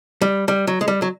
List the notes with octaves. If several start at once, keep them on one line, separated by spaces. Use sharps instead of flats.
G3
G3
F#3
G#3
G3
F#3